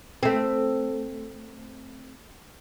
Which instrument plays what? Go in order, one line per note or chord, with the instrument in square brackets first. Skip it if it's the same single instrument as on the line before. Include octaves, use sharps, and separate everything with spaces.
[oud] A3 C4